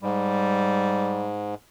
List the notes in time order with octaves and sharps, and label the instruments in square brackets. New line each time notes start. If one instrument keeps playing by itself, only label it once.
[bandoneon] G#2 [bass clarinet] G3